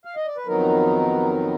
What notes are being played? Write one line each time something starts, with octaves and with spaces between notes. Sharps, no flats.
F5
D#5
D5
B4
F2 D#3 F#3 B3 D#4 A#4